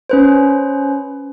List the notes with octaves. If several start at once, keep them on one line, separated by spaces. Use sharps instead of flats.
C#4 B4 C5